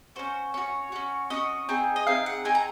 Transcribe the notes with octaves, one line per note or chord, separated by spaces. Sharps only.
C#4 F#4 C5
C#4 F#4 C#5
C#4 F#4
C#4 F#4 D#5
C4 D#4 G#4
D#5
C4 D#4 G#4 F5
F#5
C4 D#4 G#4 G#5
A#5